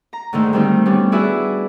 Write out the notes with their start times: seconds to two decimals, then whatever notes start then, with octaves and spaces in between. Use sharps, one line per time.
0.13 A#5
0.33 G#2 D3 D#3 A3
0.53 D#3 G3 A3 C4 D#4
0.86 G3 B3 C#4 D4 G4
1.12 E4 F#4 G#4 B4 D5 E5